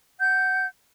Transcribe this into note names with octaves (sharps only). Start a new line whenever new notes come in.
F#5 G6